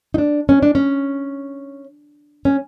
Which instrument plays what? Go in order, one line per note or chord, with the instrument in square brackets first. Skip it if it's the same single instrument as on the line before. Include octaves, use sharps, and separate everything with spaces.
[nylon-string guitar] D#4
D4
C#4
D4
C#4
C#4